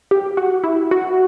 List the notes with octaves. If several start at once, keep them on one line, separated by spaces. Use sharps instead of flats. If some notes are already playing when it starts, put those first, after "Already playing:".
G4
F#4
E4
F#4